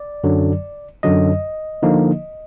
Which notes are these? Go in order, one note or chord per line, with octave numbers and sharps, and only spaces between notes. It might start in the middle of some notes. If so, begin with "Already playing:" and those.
Already playing: D5
F#2 D3 F#3
F#2 D3 F#3 D#5
D3 F3 A#3 D#4